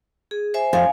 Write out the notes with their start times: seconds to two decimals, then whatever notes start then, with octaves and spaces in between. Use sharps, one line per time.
0.31 G#4
0.54 C5 E5 G#5
0.73 F2 F5 G#5